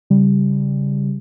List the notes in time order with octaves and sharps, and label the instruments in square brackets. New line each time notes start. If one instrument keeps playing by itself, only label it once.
[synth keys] C#3 G3